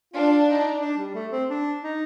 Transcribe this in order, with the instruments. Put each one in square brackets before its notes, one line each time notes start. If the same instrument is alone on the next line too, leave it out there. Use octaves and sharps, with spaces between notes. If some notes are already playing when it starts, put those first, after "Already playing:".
[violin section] D4 [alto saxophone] F4
[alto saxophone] D#4
D4
G3
A3
C4
D4
D#4